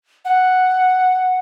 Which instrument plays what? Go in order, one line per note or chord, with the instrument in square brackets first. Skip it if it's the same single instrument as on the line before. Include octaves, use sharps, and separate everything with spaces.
[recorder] F#5